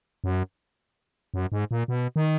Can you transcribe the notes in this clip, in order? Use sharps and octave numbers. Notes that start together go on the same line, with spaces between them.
F#2
F#2
G#2
A#2
B2
D#3